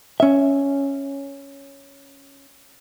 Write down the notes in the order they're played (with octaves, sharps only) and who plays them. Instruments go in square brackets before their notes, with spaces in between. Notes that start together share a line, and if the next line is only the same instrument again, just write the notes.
[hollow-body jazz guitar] C#4 E5